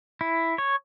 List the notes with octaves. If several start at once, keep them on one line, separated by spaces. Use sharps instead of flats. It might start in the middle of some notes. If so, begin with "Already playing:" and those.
E4
C#5